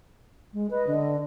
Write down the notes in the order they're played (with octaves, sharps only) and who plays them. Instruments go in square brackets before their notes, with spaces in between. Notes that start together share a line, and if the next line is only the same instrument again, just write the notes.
[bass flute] G#3
[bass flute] B4 [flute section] D#5
[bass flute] D3